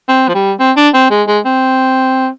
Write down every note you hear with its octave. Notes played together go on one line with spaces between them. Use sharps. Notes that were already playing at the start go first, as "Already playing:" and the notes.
C4
F3
G3
C4
D4
C4
G#3
G#3
C4